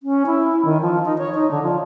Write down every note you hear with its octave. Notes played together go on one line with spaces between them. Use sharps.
C#4
E4
D#3
F3
D#4
C#5
D#4
D3
F3